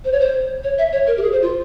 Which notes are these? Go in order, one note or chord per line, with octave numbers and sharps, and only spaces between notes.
C5
C#5
C5
C#5
E5
C#5
A#4
G4
G#4
C5
F4